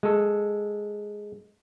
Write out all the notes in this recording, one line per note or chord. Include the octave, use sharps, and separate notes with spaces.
G#3 A4